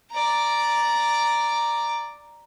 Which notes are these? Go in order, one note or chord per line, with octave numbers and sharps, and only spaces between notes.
D5 A#5